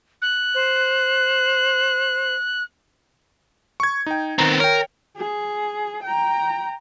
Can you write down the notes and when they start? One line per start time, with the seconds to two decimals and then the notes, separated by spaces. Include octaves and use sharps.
0.22 F#6
0.55 C5
3.80 C#6 G#6
4.06 D#4 G5
4.38 D#3 B3 C4 A#5
4.60 A#4 C#5 G5
5.17 G#4
6.03 G5 A#5